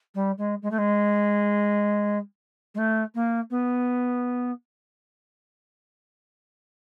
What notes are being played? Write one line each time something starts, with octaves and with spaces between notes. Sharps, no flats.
G3
G#3
G#3
A3
G#3
G#3
A3
A#3
B3